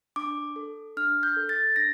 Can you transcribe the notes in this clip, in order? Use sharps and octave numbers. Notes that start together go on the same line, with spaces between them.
D4 D6
A4
D4 F6
G6
A4
A6
D4 A#6